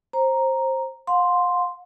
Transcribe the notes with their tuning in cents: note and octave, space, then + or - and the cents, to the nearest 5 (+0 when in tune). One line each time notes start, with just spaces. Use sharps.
C5 +20 A#5 +0
F5 +40 C6 +0